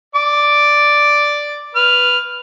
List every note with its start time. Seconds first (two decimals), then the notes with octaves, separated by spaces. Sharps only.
0.15 D5 D6
1.75 B4 F6